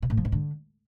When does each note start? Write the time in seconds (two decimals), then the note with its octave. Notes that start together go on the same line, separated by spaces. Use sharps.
0.02 B2
0.10 A2
0.17 F3
0.25 G#2
0.32 D3